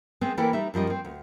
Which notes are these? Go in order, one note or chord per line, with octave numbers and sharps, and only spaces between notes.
G#3 B3 C4
E3 A#3 E4 A4 D5 G5
G3 D#4 E5
F#2 F3 G3 D#5
C4
D2